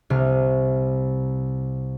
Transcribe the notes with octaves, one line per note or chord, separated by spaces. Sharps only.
C2 C3 F6